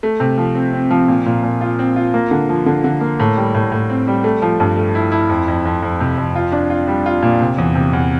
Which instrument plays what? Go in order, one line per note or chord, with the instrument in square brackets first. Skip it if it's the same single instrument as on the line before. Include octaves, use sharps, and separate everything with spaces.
[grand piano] A3
C3
F3
C4
C4
F3
A#2
A#2
A#2
F4
C4
F4
A#3
D3
F3
D3
D3
A#3
A2
G3
A2
A2
C4
G3
A3
F3
G2
A3
E4
E4
F2
F2
F2
F2
C3
F2
F4
D4
F4
G3
F4
A#2
C3
E2
C3
E2